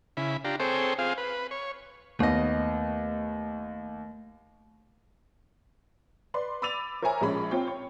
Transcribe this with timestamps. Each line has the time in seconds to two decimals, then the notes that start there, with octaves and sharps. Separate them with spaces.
0.17 C#3 E4 B5
0.45 D4 F4 G4 A#5
0.60 C4 G#4 A4 C5 C#5 G5
0.99 C4 F4 G#4 F5
1.18 B4
1.51 C#5
2.20 D#2 A3 B3 D#5
6.34 B4 D5 C6
6.62 B5 D6 E6 A6 D#7 F7
7.02 A#4 C5 C#5 E5 G#5 A#5
7.21 A#1 F3 G#3 C#4 B5
7.51 C4 F4 C#5 G5
7.68 C#5